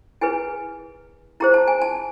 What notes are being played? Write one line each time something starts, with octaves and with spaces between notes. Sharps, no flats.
E4 G#4 B4 G#5
E4 G#4 C5 A#5
A5
G#5
A5